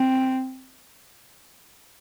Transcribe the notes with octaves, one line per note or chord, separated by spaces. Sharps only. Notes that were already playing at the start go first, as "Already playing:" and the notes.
Already playing: C4